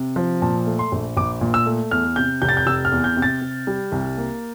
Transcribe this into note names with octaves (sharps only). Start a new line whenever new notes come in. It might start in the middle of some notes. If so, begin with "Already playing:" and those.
Already playing: C3
F3
A#2 A5
A3
C6
A#1
A#1 D6
A#2
E6
A3
E2 F6
C3 G6
F1 G6
A6
G6
F1 E6
F6
E2
G6
C3
A6
C3
G3
C2
A#3